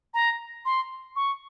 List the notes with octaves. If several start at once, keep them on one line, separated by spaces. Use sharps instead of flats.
A#5
C6
C#6